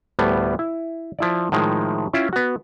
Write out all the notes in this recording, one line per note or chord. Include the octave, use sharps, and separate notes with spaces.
D2 A2 G3 B3
E4
F3 E4 D5
A2 D#3 F3 G#3
C#4 E4 F4 E5 G5
B3 F#4